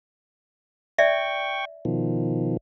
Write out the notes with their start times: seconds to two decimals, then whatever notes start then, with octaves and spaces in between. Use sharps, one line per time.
0.98 D5 E5 G5 C#6
1.85 B2 D#3 F3